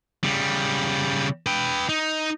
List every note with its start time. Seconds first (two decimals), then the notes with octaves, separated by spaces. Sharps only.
0.24 C#3 G3
1.46 B4 G5
1.89 D#4